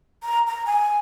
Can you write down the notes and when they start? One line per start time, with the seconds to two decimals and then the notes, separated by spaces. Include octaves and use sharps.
0.23 A#5
0.47 A#5
0.66 G#5